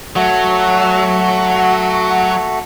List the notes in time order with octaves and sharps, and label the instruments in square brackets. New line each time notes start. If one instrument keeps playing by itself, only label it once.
[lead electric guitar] F#3 [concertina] A3 F#4